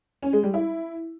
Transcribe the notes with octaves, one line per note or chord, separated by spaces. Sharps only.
C#4
G#3
G3
E4